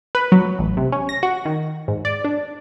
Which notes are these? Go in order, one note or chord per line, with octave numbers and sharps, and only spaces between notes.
B4
F#3
A1
C3
C#4
A#6
F#4
D#3
G#2
D5
D4